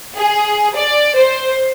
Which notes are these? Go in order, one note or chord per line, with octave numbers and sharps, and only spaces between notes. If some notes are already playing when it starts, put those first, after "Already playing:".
G#4
D5
C5